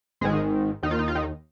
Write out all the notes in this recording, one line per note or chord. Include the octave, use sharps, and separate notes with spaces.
G#1 G#2 D#3 G#3 G#4
D#2 D#3 D#4
F4
D#4
F4
D#3 D#4